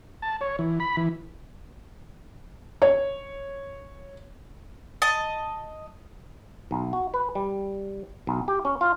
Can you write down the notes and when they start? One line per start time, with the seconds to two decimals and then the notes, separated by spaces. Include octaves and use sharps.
0.22 A5
0.41 C#5
0.59 E3
0.80 B5
0.97 E3
2.82 C#5
5.02 D#5 A5
6.71 B1
6.93 F#4
7.14 B4
7.35 G3
8.27 B1
8.48 G4
8.65 C#4
8.81 F4